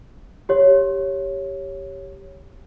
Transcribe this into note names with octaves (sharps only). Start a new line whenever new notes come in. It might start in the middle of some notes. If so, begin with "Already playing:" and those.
G4 C#5